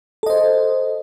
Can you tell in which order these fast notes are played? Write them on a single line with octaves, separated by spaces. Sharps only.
A4 D#5 C5